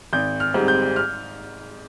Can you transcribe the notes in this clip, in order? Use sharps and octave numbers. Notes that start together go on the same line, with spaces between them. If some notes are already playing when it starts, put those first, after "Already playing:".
G#1 G6
F6
G#2 G3 C4
G6
F6